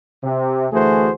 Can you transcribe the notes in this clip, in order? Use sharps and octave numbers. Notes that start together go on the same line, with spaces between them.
C3
D2 E3 A3 F#4 G#4 C5